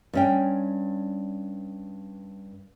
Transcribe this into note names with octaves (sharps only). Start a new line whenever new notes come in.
G2 C#4 G5